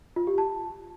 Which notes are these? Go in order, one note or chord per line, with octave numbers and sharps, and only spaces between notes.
F4
G4
A5